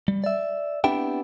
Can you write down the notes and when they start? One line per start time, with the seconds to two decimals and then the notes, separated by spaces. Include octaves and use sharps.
0.08 G3
0.24 D5 E5
0.84 B3 C4 D4 E4 G4 G5